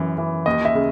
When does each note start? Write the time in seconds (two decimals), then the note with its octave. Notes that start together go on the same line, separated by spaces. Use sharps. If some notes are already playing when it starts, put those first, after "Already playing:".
Already playing: F#2 E3
0.18 E3
0.46 D#2 D#5
0.65 E5
0.75 C#3